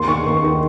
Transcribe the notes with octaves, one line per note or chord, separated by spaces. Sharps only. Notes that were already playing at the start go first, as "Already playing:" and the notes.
Already playing: D#2 C6
D#3 C#6
D#2
D#3